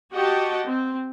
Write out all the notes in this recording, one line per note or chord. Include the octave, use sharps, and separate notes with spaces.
F#4 G4 D#5 F#5 G5 A5
C4